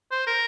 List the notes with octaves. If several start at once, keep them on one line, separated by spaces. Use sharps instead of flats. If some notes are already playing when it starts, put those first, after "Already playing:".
C5
A#4